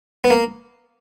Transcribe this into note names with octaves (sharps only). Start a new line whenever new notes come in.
B3
A#3